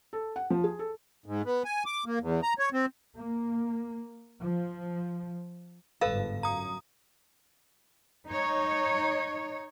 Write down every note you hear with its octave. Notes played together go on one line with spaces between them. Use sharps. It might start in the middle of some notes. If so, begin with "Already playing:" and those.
A4
F#5
F3
G#4
A4
G#2
B3
G#5
D6
A#3
E2
A#5
C#5
C4
A#3
F3
G1 G#2 A4 B4 F5
F#2 A#5 D#6
D#4 C#5